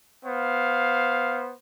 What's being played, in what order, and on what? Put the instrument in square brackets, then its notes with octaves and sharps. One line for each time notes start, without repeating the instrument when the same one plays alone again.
[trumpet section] B3 C5 [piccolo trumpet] F5